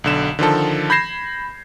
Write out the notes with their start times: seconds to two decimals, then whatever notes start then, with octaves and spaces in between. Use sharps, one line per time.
0.04 B1 D3 E7
0.39 D3 D#3 F3 A4
0.90 B5 G6 G#6 A#6 C7 E7